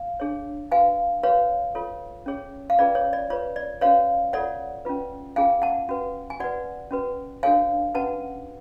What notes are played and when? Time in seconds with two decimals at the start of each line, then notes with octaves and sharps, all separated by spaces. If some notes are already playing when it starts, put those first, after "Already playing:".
Already playing: F5
0.20 D4 G#4 C#5
0.71 F#4 B4 F5 G#5
1.23 F#4 B4 C#5 F5
1.75 F4 A4 C#5
2.26 C#4 G#4 C#5
2.70 F5
2.79 C#4 F4 G#4 B4 D5
2.95 C#5
3.13 D5
3.30 F4 B4 C#5
3.56 D5
3.81 C#4 F#4 B4 C#5 F5
4.33 F4 A4 C#5 D5 F#5
4.85 C#4 F4 B4
5.36 C#4 F4 G#4 F5 G#5
5.62 F#5 A5
5.89 C#4 F#4 B4
6.30 G#5
6.40 F#4 B4 D5 F#5
6.91 C#4 F#4 B4
7.43 D4 F#4 A4 C#5 F5 G#5
7.94 C#4 F#4 B4 F#5 A5